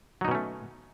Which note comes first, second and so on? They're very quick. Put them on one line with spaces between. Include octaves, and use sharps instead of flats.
F#3 D#4 B2 C#4 A3